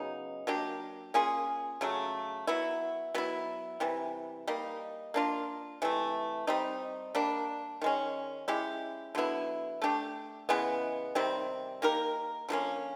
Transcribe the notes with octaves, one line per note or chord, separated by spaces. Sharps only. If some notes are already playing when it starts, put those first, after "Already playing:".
Already playing: C#3 F#3 B3 D#4
F#3 A#3 D4 G4
A#3 C#4 F4 G#4
C#3 F#3 A3
F#3 B3 E4
F#3 B3 E4
C3 E3 G3
G3 A#3 D#4
A#3 D4 F4
C3 E3 A3
G3 C4 D#4
G3 A#3 D4
D#3 G#3 C#4
G#3 C#4 E4 G4
D3 F#3 B3 E4
A3 D4 G4
C#3 E3 G#3 B3
C3 D#3 G3 C4
A#3 D#4 G4 A#4
D3 F3 A#3 C#4